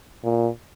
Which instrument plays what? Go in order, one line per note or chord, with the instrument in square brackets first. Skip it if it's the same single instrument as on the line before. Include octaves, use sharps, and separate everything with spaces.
[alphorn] A#2